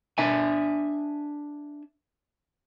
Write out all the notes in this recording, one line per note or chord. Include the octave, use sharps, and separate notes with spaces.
D4 E5 G#5